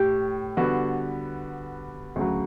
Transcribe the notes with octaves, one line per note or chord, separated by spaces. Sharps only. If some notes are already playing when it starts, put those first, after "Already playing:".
Already playing: A2 G4
D3 G3 B3 F#4
D2 C#3 F#3